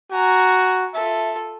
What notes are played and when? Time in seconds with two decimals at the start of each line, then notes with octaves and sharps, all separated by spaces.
0.12 F#4 G#5 A#5
0.94 F4 A4 E5